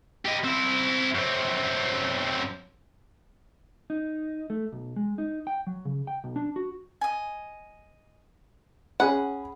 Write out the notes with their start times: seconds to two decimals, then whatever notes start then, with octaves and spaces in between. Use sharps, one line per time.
0.25 G4 D#5
0.44 C4 E4
1.15 F#2 C4
3.90 D#4
4.50 A3
4.72 B1
4.96 G#3
5.18 D#4
5.47 G5
5.67 F#3
5.85 C#3
6.07 G5
6.24 B1
6.36 D4
6.56 F#4
7.01 D#5 G#5
9.00 C#4 G#4 F#5 B5